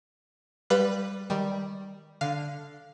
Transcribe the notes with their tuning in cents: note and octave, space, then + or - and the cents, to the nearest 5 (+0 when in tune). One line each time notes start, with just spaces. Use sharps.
G3 +0 B4 +0 F5 +20
D#3 +0 G3 +0
D3 +0 F5 +0